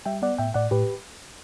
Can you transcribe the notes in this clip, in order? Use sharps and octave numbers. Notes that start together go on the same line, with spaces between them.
G3 E5 G5
B3 D5 F#5
A2 E5 G5
A2 D5 F#5
A2 G4 B4